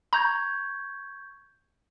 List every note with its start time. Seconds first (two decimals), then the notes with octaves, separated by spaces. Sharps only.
0.13 A#5 C#6 G6 G#6